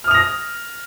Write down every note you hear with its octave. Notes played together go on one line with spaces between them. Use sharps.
D#6 F6 A#6 F7